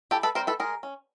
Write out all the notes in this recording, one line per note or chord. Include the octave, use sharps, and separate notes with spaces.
E3 G4 A4
A4 B4
G3 C4 A#4 C5
A4 B4
G#3 G#4 A#4
C#4